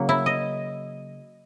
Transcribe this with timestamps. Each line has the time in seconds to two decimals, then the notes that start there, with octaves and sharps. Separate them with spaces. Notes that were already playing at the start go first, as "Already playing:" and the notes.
Already playing: C#3 F#3 A#3
0.09 E4
0.26 D#5